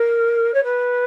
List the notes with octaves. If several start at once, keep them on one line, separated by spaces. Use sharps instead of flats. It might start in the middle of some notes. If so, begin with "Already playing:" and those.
Already playing: A#4
C#5
B4